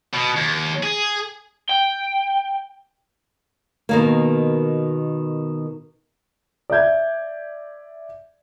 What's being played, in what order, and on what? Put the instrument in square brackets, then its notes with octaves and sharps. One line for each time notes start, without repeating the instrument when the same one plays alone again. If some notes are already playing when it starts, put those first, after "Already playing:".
[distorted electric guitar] B2
D#2
G#4
[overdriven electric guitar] G5
[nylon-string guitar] B2 D#3 A#3
[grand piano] D5 E5 G6 G#6